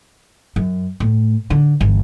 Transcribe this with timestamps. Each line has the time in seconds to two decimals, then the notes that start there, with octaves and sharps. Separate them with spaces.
0.56 F#2
1.00 A2
1.50 D3
1.80 G1 E3